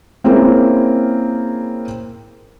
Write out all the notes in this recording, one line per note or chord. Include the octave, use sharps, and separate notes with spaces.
A#3 C4 C#4 E4 G#4 A#4